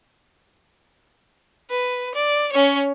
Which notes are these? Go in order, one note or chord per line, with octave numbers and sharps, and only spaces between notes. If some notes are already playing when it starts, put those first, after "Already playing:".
B4
D5
C#4 C#5